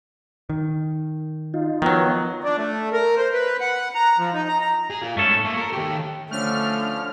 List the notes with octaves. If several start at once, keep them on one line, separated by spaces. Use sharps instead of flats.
D#3
D#4 F4
D#3 F3 F#3 B3 F4
D4
A3
A#4
C5
B4
F#5
A#5
F3
D#4
A#5
A#5
G#4
F4 A#4
G#2 A3 C#4 A4
A3 A#3
A#4
D#3 G4
D3 F3 A3 C#4 F6